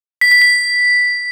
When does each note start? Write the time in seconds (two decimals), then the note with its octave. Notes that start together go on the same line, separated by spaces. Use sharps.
0.21 B6
0.32 B6
0.42 B6